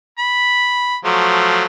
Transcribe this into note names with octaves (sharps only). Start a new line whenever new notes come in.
B5
F3 F#3 A3